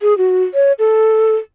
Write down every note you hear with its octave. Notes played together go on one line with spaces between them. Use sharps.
G#4
F#4
C#5
A4